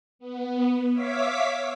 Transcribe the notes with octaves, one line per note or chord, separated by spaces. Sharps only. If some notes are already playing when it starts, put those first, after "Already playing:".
B3
C#5 E5 F5 D6 B6